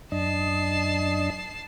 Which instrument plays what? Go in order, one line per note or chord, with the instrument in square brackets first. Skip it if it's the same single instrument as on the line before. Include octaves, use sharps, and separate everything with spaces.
[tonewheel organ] F#2 D4 D#5 [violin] A5 C7